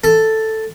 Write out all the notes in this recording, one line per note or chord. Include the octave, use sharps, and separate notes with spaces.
A4